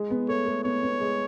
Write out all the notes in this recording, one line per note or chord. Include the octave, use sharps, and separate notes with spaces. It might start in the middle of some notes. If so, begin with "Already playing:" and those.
Already playing: G#3
B3
A3 C#5
A3
B3 C#5
B3
G#3